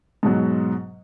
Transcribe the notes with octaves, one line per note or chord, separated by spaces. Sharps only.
G#2 B2 F#3